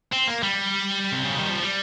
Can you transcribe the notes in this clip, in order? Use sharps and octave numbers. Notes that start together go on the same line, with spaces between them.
C4
A#3
G3
C3
C#3
D#3
F3
G3